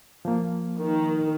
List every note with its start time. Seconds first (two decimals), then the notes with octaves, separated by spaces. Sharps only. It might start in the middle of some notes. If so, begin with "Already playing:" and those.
0.25 F3 A#3
0.79 D#3